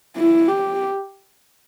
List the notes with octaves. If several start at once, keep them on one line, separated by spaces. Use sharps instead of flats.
E4
G4